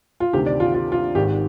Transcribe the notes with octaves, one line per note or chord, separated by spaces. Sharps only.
F4
D2 C3 D#3 G4
D5
F4
F4
F4
G#1 G#2 D#3 G4